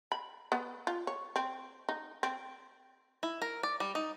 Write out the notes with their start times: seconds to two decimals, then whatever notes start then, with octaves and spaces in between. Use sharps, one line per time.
0.12 B5
0.52 B3
0.87 F4
1.07 C#5
1.36 C4
1.89 D#4
2.23 C4
3.23 E4
3.42 A#4
3.63 D5
3.80 G3
3.95 D#4